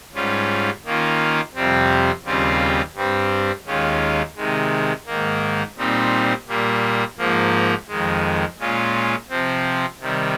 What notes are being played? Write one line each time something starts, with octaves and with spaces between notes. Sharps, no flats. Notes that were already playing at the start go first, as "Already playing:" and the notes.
G#2 G3 C#4 F4
D#3 A#3 C#4 F4
F2 C3 G3 C4
D#2 C#3 G3 C4 F4
G2 G3 C4
D#2 D#3 G#3 C#4 F4
C3 D#3 G#3
G#2 D#3 A#3
A#2 G3 C4 D#4
A#2 G3 A#3
G#2 F3 A#3
F2 D#3 G#3
A#2 G#3 C#4 F4
C3 F3 C4
C3 D#3 G3